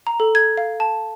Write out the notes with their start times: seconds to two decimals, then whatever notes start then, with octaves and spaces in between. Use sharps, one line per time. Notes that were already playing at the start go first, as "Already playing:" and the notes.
0.07 A#5
0.20 A4
0.35 G#6
0.58 F5
0.80 A5